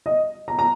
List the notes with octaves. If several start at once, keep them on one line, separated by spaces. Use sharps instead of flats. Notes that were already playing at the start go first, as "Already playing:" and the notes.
D#5
A#5
A#5